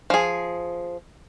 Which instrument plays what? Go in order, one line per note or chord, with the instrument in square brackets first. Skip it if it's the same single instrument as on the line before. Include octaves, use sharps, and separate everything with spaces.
[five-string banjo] F3 G#4